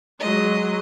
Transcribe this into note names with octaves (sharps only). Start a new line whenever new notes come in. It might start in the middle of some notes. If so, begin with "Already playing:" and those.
F#3 G#3 D#5